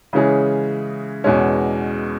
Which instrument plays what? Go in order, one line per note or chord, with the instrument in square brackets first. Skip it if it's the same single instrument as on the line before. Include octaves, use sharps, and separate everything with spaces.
[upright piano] C#3 E3 G#3 C#4 G#4
E2 B2 G#3 C#4